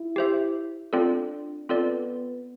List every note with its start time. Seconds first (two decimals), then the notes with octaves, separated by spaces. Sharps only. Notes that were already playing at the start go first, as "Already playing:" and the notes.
Already playing: E4
0.16 G4 C5 E5
0.93 C4 D4 F4 A4 D5
1.68 B3 C4 F4 A4 D5